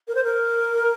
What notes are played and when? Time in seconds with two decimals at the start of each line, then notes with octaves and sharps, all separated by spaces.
0.07 A#4
0.15 C5
0.24 A#4